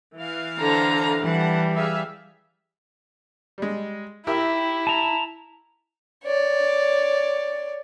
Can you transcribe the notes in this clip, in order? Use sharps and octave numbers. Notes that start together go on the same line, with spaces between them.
E3 F5
D3 A4 C5 A#5
E3 G3 F#5 A5
G#4 E5 F5
G3 G#3
E4 G4 A#4 E5
A5 A#5
C#5 D5